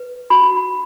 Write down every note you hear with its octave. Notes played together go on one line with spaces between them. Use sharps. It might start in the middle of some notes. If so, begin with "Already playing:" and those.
Already playing: B4
F#4 B5